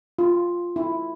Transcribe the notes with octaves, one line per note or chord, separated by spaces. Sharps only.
F4
E4